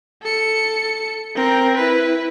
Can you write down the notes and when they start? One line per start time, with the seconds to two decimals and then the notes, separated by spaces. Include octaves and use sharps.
0.22 A4 C#7
1.36 C4 A#4
1.77 E4 B4